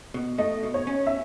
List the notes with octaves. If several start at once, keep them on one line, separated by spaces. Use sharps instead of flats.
B2
A3 D#5
B2
C#5
C#4
E5